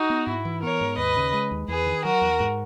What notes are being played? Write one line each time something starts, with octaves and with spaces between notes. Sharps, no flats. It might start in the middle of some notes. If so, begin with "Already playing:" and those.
Already playing: D#4 F#4
B3
G#2 E4
E3
B3 A#4 C#5
G#2
D#2 B4 D#5
C#3
G#3
D#2
E2 G#4 B4
D#3
F#3 F#4 A#4
E2
G#2